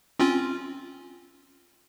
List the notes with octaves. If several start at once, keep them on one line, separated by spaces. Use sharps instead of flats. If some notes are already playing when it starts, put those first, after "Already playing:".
C4 C#4 F4